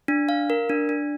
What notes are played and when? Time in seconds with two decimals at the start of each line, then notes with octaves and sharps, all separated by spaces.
0.08 D4
0.29 F5
0.50 A#4
0.69 D4
0.89 D4